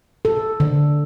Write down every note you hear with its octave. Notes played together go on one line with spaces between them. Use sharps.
A4
D3